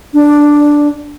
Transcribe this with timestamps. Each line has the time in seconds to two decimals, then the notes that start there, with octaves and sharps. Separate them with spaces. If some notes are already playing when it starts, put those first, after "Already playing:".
0.14 D4